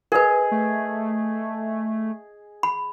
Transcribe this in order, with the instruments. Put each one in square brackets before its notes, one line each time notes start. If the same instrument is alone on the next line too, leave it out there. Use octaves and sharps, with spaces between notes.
[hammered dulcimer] G#4 D#5 [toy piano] A#4 B4
[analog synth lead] A3
[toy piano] B5